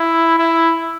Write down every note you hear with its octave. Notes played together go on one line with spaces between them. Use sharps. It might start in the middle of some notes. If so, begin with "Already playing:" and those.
Already playing: E4
E4